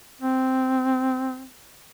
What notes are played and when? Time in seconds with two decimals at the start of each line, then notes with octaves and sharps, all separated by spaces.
0.21 C4